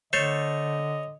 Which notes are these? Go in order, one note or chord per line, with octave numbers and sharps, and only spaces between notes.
D3 A3 A4 C5 C#5 D#5